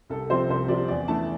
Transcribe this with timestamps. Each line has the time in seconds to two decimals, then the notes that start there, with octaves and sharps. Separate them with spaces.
0.10 C2 A4
0.29 C3 F3 C4 C5
0.49 C2 C5
0.68 C3 F3 C4 D5
0.88 E2 D5
1.08 E3 A3 D4 A5